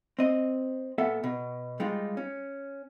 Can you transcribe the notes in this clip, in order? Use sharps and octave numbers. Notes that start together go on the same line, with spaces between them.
C4 D#5
A#2 B3 A4 E5 F#5
B2
G3 G#3 D#4 F4
C#4